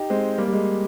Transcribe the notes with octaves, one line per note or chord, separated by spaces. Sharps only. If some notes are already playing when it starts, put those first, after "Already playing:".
Already playing: D#4 G4
G#3 C4
G3 A#3
G3
G#3